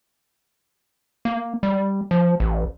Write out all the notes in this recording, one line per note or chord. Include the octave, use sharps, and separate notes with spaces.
A#3
G3
F3
A1